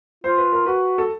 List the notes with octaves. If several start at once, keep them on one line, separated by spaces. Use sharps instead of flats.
F4 C5
B4
A#4
F#4 B4
A4